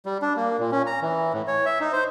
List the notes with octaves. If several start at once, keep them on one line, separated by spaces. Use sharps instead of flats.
G3
D4
A#3
A#2
C#4
A#5
E3
A2
C#5
E5
D#4
C5